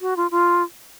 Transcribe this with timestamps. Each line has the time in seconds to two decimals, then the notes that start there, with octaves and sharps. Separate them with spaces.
0.01 F#4
0.17 F4
0.31 F4